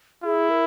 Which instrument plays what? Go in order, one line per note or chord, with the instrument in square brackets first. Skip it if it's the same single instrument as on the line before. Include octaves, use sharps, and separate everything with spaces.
[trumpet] E4 [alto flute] G#4
[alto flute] A#4